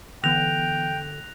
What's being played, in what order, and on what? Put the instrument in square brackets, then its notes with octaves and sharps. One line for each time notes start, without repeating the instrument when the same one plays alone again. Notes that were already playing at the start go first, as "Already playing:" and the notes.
[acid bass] D3 [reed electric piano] E3 B3 [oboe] G5 [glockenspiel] F#6 A#6 F7